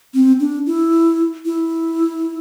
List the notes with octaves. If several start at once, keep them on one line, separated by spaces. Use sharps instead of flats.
C4
D4
E4
E4